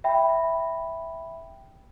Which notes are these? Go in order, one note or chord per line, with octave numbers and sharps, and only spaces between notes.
E5 G5 B5